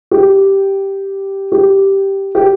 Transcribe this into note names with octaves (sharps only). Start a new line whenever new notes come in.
G4
G4
G4